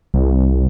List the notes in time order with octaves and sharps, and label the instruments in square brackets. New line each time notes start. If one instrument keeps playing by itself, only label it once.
[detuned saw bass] C2